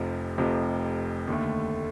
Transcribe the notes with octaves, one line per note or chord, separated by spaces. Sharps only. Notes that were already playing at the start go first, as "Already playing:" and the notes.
Already playing: F1 F2 C3 F3
F1 F2 C3 F3
D#2 D3 A3